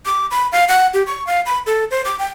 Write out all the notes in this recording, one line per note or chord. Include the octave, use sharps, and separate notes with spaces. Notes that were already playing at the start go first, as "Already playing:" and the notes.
D6
B5
F5
F#5
G4
C#6
F5
B5
A4
C5
D6
G5